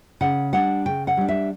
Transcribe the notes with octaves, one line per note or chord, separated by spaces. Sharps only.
C#3 F#5
G3 D4 F#5
C#3 G5
F#5
G3 D4
E5